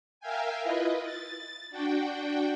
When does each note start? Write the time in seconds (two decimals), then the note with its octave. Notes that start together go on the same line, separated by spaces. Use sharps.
0.20 A#4 E5 F5 G5 G#5
0.63 E4 F4 B4 D#5
1.02 A6
1.70 D4 F#4 G5